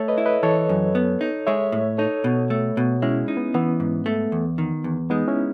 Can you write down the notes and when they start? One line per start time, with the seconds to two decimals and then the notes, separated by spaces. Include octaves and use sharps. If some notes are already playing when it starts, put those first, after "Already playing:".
Already playing: A3 A4 C#5
0.08 B4 D#5
0.18 E4
0.25 B4 D#5
0.43 E3 A4 C#5
0.69 F#2
0.95 B3
1.21 D#4
1.47 G#3 C#5 E5
1.72 A2
1.98 D#4 A4 C#5
2.24 B2
2.50 A3
2.77 B2
3.02 G#3 C#4 E4
3.28 D#4
3.37 B3
3.54 E3 B3
3.80 G#2
4.06 A3
4.32 E2
4.58 D#3
4.84 E2
5.10 G#3 B3 D#4
5.28 C#4 E4